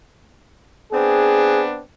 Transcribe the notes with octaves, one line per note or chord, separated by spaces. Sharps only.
B3 C4 D4 G#4